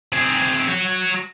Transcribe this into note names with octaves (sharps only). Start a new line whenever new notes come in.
C4 G#4
F#4 C#5